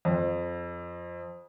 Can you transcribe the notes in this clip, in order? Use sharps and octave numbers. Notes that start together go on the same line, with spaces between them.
F2